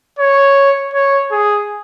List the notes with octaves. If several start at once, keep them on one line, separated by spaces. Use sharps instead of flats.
C#5
C#5
G#4